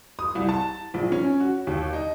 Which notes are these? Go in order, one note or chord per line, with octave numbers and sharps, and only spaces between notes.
D#6
C2
A5
A#1
C#4
F#4
D#2
D#4